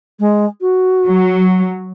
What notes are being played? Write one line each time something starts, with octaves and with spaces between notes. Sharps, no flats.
G#3
F#4
F#3